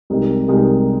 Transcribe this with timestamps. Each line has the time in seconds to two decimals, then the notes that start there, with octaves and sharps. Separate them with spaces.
0.10 C2 C3 G#3 D#4 A#4
0.48 C2 C3 G#3 D#4 A#4